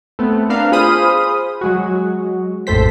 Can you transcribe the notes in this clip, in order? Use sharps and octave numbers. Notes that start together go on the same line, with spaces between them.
A3 B3 C4
B3 C4 D4 A#4 B4 F5
F4 G#4 C5 B5 D#6 F6
F#3 G#3 F#4
A#1 F2 A2 A4 C5 B6